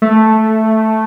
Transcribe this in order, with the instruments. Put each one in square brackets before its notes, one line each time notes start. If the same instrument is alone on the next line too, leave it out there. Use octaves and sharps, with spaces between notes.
[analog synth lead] A3